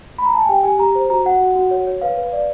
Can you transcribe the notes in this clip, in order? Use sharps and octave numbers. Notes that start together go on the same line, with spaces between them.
B5
A#5
A5
G#5
G4 G5
G4 G#5
G4 A#5
C5
F#4 A#5
F#4 F#5
F#4
F#4
C#5
C#5
B4 F5
B4
D5